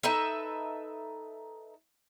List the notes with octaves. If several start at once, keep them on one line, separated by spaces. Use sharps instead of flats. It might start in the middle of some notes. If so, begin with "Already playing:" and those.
D#4 A4 B4 E5